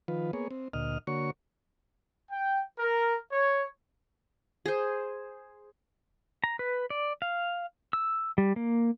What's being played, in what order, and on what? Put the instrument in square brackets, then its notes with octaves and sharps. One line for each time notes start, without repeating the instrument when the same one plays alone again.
[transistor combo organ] D#3 F3 F4 B4
A#3 B3 G#4 C#5
C4
D2 A#2 D#5 F6
D3 A#3 F#4 C#5 C#6
[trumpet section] G5
A#4
C#5
[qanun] G#4 C5
[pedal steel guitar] A#5
B4
D5
F5
E6
G3
A#3